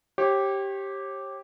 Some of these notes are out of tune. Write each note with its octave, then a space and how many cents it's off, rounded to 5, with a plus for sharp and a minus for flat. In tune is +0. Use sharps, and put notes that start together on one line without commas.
G4 -5 C#5 -40